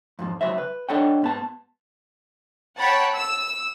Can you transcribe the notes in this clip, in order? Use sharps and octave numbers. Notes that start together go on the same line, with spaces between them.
F2 G#2 F3
C#2 F#3 C5 E5
B4
D4 A4 C#5 D#5 F#5 G5
G#2 B3 A5
C#5 F#5 G5 A5 B5
E6